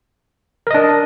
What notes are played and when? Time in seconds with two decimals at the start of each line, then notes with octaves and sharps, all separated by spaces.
0.67 A#4
0.71 D#5
0.74 D4